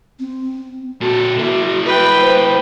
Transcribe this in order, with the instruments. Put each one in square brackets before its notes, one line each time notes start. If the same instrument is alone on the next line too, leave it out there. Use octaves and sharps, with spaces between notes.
[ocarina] C4
[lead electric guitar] A#2 A4 [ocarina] F#4
[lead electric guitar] A#3 E4
[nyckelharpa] B4 G5
[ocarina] C5